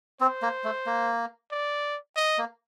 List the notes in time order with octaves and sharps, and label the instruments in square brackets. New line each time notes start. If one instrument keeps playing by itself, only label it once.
[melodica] C4 [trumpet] C5
[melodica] A#3
A3
A#3
[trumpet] D5
D#5
[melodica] A#3